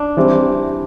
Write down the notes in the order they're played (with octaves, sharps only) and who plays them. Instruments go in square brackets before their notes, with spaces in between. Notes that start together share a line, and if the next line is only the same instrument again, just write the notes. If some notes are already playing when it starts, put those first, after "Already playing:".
Already playing: [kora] D4
[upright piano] E3 G3 C4